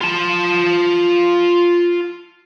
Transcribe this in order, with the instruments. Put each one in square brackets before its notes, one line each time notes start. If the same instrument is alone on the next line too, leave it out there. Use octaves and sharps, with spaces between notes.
[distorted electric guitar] F4 A5